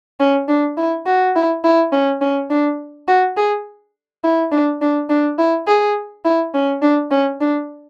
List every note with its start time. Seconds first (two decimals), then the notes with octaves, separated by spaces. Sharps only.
0.20 C#4
0.48 D4
0.77 E4
1.06 F#4
1.35 E4
1.64 E4
1.93 C#4
2.21 C#4
2.50 D4
3.08 F#4
3.37 G#4
4.24 E4
4.52 D4
4.81 D4
5.10 D4
5.38 E4
5.67 G#4
6.24 E4
6.54 C#4
6.82 D4
7.11 C#4
7.41 D4